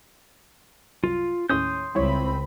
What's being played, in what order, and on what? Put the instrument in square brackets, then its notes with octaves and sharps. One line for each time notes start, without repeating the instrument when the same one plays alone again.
[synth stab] C2 F#2 [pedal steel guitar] F4
[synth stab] D#2 A2 C#4 [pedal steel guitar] C6 D#6 G6
[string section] C#2 C4 B5 [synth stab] G3 E4 C#5